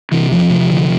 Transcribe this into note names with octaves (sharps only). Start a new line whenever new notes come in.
C3 E3
E2 F3
C3
D3